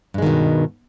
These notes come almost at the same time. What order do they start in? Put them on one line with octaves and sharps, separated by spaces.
G2 G#3 D#3 B2